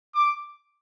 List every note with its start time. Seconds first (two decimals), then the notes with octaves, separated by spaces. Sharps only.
0.15 D6